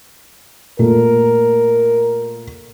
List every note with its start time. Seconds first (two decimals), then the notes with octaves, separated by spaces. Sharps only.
0.79 A#2 A3 A#4